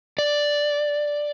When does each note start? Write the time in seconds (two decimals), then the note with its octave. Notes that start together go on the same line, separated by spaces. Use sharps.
0.19 D5